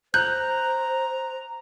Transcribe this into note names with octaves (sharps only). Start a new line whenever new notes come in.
C5 A#5 F#6 G6